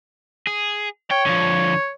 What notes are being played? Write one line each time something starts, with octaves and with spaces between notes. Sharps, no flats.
G#4
C#5 G5
D3 F3